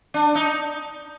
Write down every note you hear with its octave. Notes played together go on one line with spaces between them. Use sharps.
D4
D#4